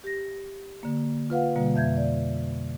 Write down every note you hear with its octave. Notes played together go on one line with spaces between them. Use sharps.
G4 A#6
D3 A#3
F4 B4 F5 F#5
B2 D3 G3 A#3
F2 E5 G6 G#6
D5